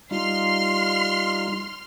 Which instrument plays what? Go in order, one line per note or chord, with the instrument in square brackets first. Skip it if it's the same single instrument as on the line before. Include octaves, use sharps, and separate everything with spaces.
[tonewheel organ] G3 D#4 F4 [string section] C6 F6